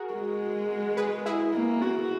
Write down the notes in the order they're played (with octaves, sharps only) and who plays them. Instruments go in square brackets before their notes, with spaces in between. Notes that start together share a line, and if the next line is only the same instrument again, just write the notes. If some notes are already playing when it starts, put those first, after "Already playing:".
Already playing: [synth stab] F#4 G#4 A#4
[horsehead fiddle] G#3
[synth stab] G#4 B4
E4 G#4
[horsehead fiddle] A#3
F#4